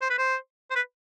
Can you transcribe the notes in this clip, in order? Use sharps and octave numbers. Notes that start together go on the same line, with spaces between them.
C5
B4
C5
C5
B4